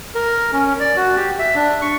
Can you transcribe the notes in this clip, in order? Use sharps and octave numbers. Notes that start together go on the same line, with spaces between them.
A#4
C#4
D5
F#4
G4
E5
D4
C#6